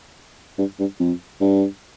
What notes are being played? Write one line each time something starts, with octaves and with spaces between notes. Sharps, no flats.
G2
G2
F2
G2